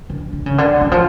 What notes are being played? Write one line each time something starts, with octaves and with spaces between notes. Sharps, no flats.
D3
D3
C#3
D3
E3
F3